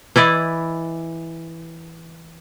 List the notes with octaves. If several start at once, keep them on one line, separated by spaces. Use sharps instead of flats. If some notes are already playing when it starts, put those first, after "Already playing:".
E3 E4 D5 D#5